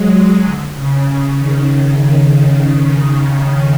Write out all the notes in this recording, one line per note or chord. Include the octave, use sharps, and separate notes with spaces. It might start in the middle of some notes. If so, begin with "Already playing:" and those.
Already playing: F#3 G#3
D3
C#3
C#3
D#3